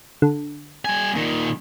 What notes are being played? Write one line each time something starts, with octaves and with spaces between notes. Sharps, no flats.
D3
G3 G#5
A#2 D#3